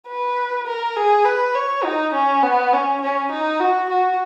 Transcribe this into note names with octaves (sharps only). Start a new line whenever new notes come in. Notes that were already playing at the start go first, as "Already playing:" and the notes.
B4
A#4
G#4
B4
C#5
D#4
C#4
B3
C#4
C#4
D#4
F#4
F#4